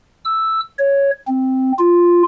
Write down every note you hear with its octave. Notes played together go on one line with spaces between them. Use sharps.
E6
C#5
C4
F4